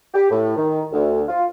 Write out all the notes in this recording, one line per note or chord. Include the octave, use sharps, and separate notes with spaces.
G4
A2
D#3
D2
F4